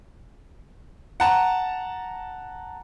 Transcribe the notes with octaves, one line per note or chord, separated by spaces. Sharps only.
F#5 A5 A#5